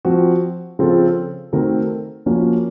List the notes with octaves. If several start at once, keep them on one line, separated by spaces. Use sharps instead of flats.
F3 C4 F#4
C#3 F3 C4 F4 A4
D#3 A3 C4 F#4 A#4
F3 A#3 C#4 F#4